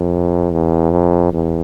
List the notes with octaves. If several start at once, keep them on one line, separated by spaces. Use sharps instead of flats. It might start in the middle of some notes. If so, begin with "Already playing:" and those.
Already playing: F2
E2
F2
E2